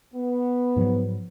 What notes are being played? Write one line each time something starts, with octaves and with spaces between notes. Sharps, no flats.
B3
G#2 F3 F#3